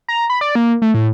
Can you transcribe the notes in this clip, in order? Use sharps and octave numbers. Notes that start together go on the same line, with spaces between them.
A#5
B5
D5
A#3
A3
A2